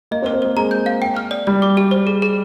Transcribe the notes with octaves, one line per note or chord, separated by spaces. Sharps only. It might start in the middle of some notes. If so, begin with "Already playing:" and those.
A#3 D#5
C4
C5
C4
A#3 C5
G#3 A#5
G6
F5
G5
F6
D5
G3 D5
D6
G4
C5
G#4
G#4